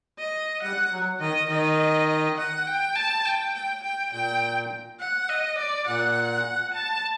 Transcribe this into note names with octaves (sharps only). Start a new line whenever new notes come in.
D#5
G3 F#5
F#3
D#3 D#5
D#3 D#5
F#5
G5
A5
G5
G5
G5
A#2 G5
F#5
D#5
D5
A#2 F#5
A5